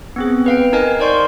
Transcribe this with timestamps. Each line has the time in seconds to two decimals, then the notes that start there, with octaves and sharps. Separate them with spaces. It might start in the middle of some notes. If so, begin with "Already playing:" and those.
0.16 B3 C4 G#4
0.46 B4 F5 G5
0.73 D#4 A#4 D#5 G#5
1.00 A#4 C5 D5 C6 C#6 G6